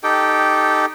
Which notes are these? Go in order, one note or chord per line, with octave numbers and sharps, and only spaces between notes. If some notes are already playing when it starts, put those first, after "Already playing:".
D#4 G4 A4 G5